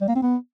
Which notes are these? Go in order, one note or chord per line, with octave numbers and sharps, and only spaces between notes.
G3
A#3
C4
B3